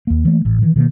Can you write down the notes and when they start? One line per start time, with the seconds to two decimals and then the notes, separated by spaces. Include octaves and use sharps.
0.07 D#2 A#3
0.25 E3 A3 A#3
0.45 A1 A2
0.62 D#3 E3
0.76 B2 D#3 A3 A#3